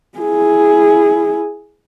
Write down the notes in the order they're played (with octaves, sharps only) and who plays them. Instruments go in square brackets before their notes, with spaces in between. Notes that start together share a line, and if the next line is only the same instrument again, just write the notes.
[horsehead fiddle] E4 G#4